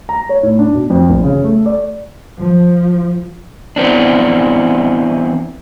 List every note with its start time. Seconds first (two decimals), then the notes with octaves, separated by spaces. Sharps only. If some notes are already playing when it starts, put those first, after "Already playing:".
0.09 A#5
0.29 C#5
0.43 A2
0.59 D4
0.74 B2
0.90 F2
1.09 A#1
1.24 C#3
1.44 A3
1.66 D5
2.40 F3
3.76 E3 B3 C4 D4